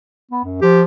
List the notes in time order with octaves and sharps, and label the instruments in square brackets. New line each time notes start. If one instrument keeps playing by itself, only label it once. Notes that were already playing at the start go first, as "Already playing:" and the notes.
[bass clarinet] B3
F#2
[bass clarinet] F3 [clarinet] G4